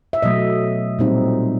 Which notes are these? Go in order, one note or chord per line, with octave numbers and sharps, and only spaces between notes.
E5
B2 F#3 A3 D#5
A#2 G3 C4 D#4